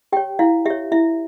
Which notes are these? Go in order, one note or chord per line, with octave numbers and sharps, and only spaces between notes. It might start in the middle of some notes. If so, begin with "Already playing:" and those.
G4 C#5 G5
E4 F5
G4 C#5 E5
E4 E5